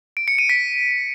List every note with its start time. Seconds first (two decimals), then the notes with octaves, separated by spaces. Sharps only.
0.17 D7
0.28 C#7
0.39 D#7
0.49 B6